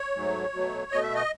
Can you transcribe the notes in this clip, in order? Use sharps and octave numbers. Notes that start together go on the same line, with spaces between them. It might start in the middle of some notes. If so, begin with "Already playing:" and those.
Already playing: C#5
G#2 F#3 A3
B2 F#3 A3
B2 A3 D#5
E5
D#5